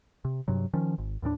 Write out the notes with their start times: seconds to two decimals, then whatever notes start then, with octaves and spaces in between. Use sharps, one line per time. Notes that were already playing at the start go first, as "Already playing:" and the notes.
0.25 C3
0.48 G2 C3 F#3
0.74 D#3 F3 C#4
0.98 G#1
1.22 D#2 A2 F3 D4